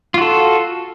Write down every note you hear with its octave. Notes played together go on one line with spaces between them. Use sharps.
F4 F#4 A4